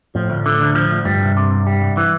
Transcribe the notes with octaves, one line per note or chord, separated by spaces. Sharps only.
A2 F3
D2
D3
D2
F3
D2
G2 G3
C2
C3
C2
G3
C2
E3